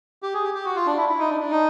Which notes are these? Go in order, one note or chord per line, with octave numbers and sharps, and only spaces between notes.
G4
G#4
G4
G4
F#4
F4
D4
E4
E4
D#4
D4
D4
D#4